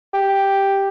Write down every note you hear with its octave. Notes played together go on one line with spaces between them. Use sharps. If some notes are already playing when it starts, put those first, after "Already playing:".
G4